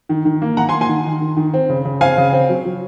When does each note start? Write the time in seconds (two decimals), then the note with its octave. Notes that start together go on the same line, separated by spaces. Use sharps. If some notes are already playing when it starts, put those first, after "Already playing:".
0.09 D#3
0.25 D#3
0.42 A#3
0.57 D#3 F#5 A#5
0.69 G#5 C6
0.73 A#3
0.81 G#5 C6
0.89 D#3
1.05 D#3
1.21 D#3
1.37 D#3
1.54 C4
1.70 C#3
1.85 C#3
2.01 C4 F5 G#5
2.18 C#3
2.33 C4
2.49 F#3
2.65 F#3